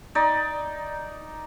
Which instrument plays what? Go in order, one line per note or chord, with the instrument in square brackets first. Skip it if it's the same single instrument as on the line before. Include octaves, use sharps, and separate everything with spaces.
[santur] D#4 D5